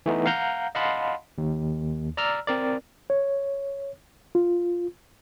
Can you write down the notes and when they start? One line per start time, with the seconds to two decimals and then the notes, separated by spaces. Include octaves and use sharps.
0.06 E3 A3 B3 D#4
0.26 F5 F#5 A#5 G6
0.75 D#5 F5 F#5 A5 B5 C6
1.38 D#2
2.17 D5 A#5 E6 F6
2.47 C4 A#4 D5
3.10 C#5
4.35 F4